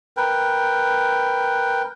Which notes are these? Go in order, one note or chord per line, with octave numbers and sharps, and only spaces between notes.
A#4 B4 G5